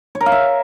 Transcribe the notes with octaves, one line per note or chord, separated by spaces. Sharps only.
C#5
A#4
F5
E5